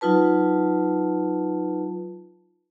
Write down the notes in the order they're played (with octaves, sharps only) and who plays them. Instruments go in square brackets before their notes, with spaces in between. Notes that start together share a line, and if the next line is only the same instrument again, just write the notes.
[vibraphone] F#3 D#4 F4 B4 A5